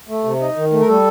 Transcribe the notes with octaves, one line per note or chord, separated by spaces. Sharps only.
A3
C3
D#4
D#3
A3
A#4
G3 A4